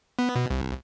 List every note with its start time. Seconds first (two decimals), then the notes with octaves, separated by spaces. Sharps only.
0.19 B3
0.36 B2
0.50 C2